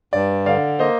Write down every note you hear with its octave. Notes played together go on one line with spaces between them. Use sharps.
G2 D5
D3 D5 F5
A#3 C5 D#5